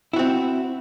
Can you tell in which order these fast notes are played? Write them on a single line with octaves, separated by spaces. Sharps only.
E4 F#4 C4